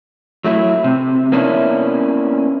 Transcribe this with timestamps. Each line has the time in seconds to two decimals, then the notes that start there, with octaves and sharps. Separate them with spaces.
0.44 F#3 A3 E4
0.84 C3
1.32 A#3 B3 C#4 D4 E4